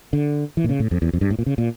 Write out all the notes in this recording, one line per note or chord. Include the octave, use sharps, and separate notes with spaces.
D3
E3
A#2
C#3
A2
F2
E2
F2
G2
A2
A#2
C#3
A#2